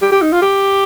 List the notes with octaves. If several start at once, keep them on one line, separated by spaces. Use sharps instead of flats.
G4
G4
D#4
F4
G4